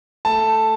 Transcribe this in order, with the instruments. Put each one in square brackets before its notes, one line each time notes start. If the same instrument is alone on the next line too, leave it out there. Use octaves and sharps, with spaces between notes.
[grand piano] A3 A5